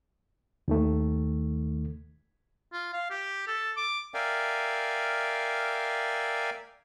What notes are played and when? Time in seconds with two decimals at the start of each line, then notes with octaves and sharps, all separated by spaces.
0.68 D#2 D#3 A3
2.73 F4
2.93 F5
3.10 G4
3.48 A4
3.77 D6
4.14 A#4 D5 E5 F5 G5 G#5